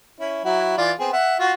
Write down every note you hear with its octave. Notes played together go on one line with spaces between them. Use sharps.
C#4 E4
F#3 E4 F#4
E3 F4 D5
B3 C4 G#4
E5 F#5
F4 F#4